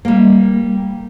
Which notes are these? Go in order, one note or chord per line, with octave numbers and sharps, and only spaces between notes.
G3 A#3